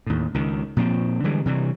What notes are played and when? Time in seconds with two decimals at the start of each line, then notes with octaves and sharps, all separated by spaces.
0.06 D#2 A2
0.34 C#2 D#3
0.77 A#2 F3 F#3 C4
1.24 D3 E3 G3 G#3
1.46 C3 E3 G3